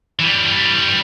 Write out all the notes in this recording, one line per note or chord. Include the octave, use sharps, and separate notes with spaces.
E3 G3